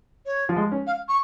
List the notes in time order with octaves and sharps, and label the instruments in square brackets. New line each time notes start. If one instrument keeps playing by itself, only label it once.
[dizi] C#5
[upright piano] F3
G#3
C#4
[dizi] F5
C#6